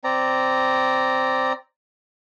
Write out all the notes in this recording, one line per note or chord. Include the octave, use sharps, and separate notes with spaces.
C4 D5 A#5